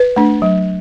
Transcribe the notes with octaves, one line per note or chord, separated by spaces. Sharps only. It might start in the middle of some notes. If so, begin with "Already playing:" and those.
Already playing: B4
A3 D4
F#3